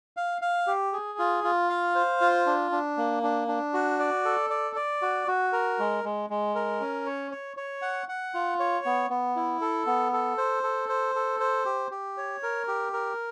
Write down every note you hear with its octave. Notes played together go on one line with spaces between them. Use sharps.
F5
F5
G4
G#4
F4
F4
F5
C5
F4
D4
D4
A#3
D4
D4
F#4
D5
A4
D5
D5
F#4
F#4
A#4
G#3
G#3
G#3
A#4
C#4
C#5
C#5
C#5
F#5
F#5
F4
C#5
B3
B3
E4
A4
B3
A4
C5
A4
C5
A4
C5
G4
G4
C#5
A#4
G4
A#4